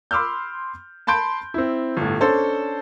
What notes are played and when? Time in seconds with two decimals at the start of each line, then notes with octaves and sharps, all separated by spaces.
0.11 B5 C6 D6 E6 F6 G6
1.07 A5 B5 C6 G6 D7
1.54 C4 E4
1.97 G1 A2
2.21 C#4 D4 A4 C5